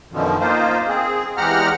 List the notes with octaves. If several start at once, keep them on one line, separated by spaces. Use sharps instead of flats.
F#2 B2 D3 D#3 F3
A#3 D#4 F4 C5
C4 G#4
E2 G#3 G4 F#5 A#5 F6